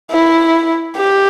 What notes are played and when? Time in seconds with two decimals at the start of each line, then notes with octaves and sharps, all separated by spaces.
0.11 E4
0.97 G4